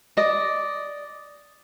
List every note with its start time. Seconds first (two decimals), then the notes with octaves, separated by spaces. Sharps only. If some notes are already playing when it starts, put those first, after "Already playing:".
0.17 D5 D#5